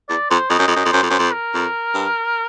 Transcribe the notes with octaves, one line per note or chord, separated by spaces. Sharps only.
E2 D5
F2 C5
F2 D#5
F#2
F2 D#5
F#2
F2
F#2 C5
F2
F#2 C5
F2
A#4
F2
G2